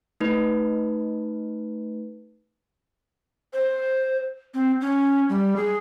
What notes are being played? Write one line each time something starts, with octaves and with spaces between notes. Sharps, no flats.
A3 D#4 B4
C5
C4
C#4
G3
G#4